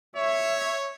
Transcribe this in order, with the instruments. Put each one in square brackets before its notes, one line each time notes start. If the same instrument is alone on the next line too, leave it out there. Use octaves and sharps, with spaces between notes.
[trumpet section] C#5 [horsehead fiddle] E5